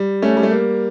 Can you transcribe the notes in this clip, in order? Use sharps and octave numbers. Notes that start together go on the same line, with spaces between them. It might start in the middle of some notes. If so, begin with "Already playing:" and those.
Already playing: G3
A3 C#4
G3
A3
A#3